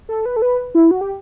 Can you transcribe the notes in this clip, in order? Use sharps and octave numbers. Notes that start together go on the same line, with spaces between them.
A4
B4
A4
B4
E4
F#4
G4